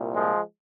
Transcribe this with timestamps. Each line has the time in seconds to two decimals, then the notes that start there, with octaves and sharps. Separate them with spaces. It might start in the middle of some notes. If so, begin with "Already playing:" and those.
Already playing: C2 A#2
0.15 F3 G#3